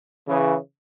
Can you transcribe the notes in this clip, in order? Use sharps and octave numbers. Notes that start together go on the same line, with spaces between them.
C#3 E3